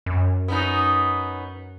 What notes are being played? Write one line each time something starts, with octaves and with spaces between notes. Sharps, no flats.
F#2
B3 C#4 D#4